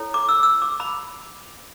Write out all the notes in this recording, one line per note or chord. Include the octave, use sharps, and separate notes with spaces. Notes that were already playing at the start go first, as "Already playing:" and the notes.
Already playing: E4 A4 C#5
D6
E6
E6
D6
B5